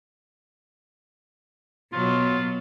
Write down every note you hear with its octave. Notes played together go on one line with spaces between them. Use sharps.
B2 F#3 F4